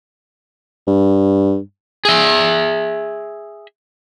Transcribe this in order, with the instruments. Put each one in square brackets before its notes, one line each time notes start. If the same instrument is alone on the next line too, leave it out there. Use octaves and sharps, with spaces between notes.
[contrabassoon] G2
[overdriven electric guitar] G#4 E5